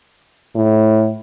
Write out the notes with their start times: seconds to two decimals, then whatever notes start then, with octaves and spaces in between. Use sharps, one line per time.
0.56 A2